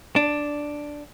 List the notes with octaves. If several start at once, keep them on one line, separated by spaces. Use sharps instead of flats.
D4